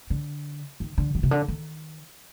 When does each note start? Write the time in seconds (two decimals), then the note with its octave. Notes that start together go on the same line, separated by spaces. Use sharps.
0.10 D3
0.80 D#3
0.98 D3
1.15 D#3
1.23 C3
1.31 D3
1.48 D#3